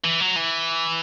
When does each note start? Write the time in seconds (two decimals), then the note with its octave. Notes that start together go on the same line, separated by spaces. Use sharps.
0.05 E3
0.21 F#3
0.36 E3